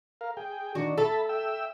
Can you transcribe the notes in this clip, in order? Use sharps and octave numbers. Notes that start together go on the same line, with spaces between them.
A#4 F5
G#4 G5
D#3 D4 F#4
A4 E5 A5 B5
E5 G5 E6